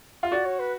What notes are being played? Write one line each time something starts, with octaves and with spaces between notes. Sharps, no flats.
F4
F#4 D5
C#5
B4